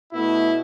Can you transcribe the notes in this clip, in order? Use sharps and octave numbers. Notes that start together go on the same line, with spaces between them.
B2 A3 B3 E4